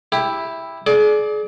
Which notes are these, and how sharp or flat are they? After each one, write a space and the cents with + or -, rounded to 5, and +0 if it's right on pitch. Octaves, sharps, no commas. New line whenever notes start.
E4 +0 G4 +15
G#4 +35 D5 +0